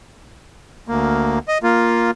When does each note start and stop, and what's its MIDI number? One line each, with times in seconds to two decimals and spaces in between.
0.88 1.39 38
0.88 1.39 58
1.48 1.58 75
1.63 2.11 58
1.63 2.11 65